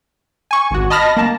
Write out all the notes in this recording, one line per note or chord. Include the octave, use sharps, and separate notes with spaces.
G#5 C#6
G#1 F#4
D#5 A5 B5 F6 A#6
A#3 A5